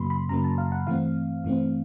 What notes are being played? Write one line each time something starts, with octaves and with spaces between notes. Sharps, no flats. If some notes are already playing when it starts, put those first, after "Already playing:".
Already playing: F#2 C#3 F#3 A#3 B5 C6
B5
F#2 C#3 F#3 A#3 A#5
A5
F5
F#5
G2 E3 A3 C4 F5
G2 E3 A3 C4